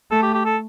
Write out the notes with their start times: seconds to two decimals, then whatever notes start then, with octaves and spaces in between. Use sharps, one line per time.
0.11 A3 A4
0.22 G4
0.34 G4
0.45 A4